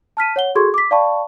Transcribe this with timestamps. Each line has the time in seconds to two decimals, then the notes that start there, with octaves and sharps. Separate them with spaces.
0.17 A5 F6 B6 D#7
0.36 C#5 F#5 G7
0.55 F#4 G#4 A4 C6 C#6 G#6
0.74 D6 B6
0.91 D5 F5 G5 A5 B5 C#6